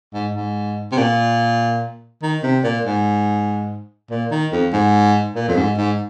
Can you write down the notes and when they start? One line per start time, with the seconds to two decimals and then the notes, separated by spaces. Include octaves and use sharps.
0.14 G#2
0.35 G#2
0.92 C3
0.98 A#2
2.23 D#3
2.43 C3
2.64 A#2
2.85 G#2
4.11 A#2
4.31 D#3
4.52 F2
4.73 G#2
5.36 A#2
5.48 F2
5.57 G#2
5.77 G#2